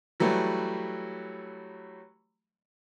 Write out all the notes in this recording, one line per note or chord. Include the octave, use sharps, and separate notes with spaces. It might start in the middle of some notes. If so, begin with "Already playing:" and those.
E3 F#3 G3 A3